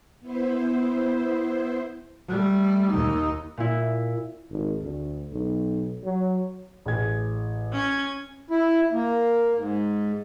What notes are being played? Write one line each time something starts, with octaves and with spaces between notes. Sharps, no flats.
B3 E4 C5
G3 A3
D#2 D#4
A#2 E4
G#1
D2
B1
F#3
A1 G#4 G#6
C#4 G#6
E4
A#3
G#2